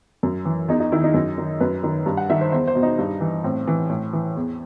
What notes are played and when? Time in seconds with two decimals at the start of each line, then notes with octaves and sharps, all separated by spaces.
0.23 F#2
0.45 E3
0.68 E2 D#4
0.80 D#4
0.92 D#3 E4
1.04 D#4
1.14 F#2
1.38 D#3
1.60 F#2 B4
1.83 D#3
2.06 G2
2.17 F#5
2.30 D#3 E5
2.41 C5
2.52 E2 C5
2.68 C5
2.75 B2
2.83 D#4
2.98 G2
3.21 E3
3.44 A2 C4
3.67 E3
3.89 A2
4.13 E3
4.36 E2